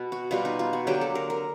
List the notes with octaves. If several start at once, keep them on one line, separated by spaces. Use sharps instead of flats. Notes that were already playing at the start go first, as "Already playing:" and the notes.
Already playing: B2 B3
F#4
B2 G3 B3 F4
D#4
F4
F#4
D3 F#3 A#3 G4
A4
A#4
A#4